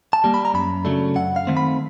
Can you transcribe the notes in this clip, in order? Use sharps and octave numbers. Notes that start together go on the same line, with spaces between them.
A5
G3 A#3
B5
A#5
F#2 B5
C#3 F#3 A3 D4
F#2 F#5
F5
D#3 F#3 A3 C4
B5